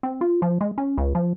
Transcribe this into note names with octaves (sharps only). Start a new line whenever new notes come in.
C4
F4
F3
G#3
C#4
C#2
F3